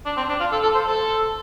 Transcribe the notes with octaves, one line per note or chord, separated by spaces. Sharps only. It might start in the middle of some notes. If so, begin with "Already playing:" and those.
D4
C4
D4
F4
A4
A4
C5
A4